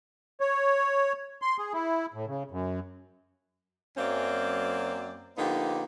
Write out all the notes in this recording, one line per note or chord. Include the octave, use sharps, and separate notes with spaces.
C#5
C6
G#4
E4
A2
C#3
F#2
F#2 F#3 A#3 C4 C#4 D5
D3 F3 A#3 B3 D#4 G4